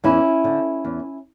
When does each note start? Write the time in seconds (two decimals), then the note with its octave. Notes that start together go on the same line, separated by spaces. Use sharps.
0.04 E2 C#4 E4
0.44 D3
0.85 E2